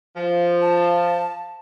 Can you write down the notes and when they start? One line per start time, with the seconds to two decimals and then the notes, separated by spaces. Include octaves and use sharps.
0.16 F3
0.62 A5